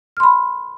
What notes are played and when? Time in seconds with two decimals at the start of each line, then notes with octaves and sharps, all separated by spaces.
0.17 F6
0.20 C6
0.23 B5